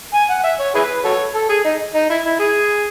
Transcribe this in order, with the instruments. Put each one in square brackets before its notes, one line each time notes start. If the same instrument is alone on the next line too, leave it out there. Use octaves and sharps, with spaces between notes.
[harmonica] G#5
F#5
E5
C#5
E4 G#4 B4
F#4 A4 C#5
A4
G#4
D#4
D#4
E4
E4
G#4